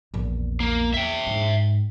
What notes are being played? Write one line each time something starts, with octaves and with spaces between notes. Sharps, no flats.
A#1 E2
A#3
E2 E5 G5
G#2